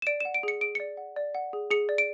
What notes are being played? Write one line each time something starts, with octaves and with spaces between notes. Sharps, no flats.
E7
D5 D7
E7
F#5
D7
G#4 C#7
G#4 D7
D5 C#7
F#5
D5
F#5
G#4
G#4 C#7
D5
D7